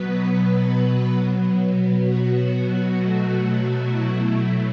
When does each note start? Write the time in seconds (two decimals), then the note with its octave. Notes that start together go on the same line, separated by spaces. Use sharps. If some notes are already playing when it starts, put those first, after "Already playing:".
Already playing: B2 F#3 B3 B4
2.01 F#4
2.96 B2 F#3 A3
3.90 E4
4.21 E4